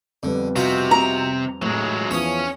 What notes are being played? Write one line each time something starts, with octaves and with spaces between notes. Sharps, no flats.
F2 D3 G3 B3
C3 D#4 F4 F#4
A#5
A1 F#3 G#3
E2 E3 F3 C#4 C#5 D#6